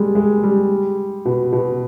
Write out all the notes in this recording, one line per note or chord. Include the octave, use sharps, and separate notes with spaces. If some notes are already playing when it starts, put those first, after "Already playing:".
Already playing: G3 G#3
G#3
G3
B2
B2